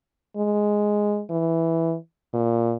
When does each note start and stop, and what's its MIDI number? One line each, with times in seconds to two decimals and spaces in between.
0.37 1.22 56
1.30 1.96 52
2.34 2.76 46